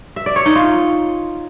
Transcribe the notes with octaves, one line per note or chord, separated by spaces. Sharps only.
E5
D5
C#5
D#4
F4